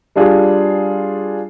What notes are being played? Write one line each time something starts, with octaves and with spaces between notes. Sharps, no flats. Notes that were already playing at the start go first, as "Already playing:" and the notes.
G3 D4 F4 G#4